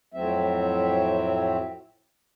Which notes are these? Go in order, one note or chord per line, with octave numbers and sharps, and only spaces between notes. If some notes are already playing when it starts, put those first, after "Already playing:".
F2 A2 F#3 C4 E5